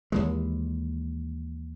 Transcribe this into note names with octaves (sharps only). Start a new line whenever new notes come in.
D#2 E3 G#3